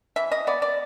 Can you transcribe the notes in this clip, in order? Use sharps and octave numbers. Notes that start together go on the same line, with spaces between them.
E3 E5
D#5
B3 D5
D5